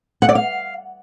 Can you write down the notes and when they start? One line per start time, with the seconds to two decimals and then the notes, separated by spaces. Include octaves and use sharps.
0.22 F#5
0.29 D5
0.35 F5